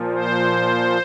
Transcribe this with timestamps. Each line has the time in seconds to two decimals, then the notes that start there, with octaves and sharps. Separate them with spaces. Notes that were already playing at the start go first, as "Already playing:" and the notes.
Already playing: A#2 F3
0.12 C5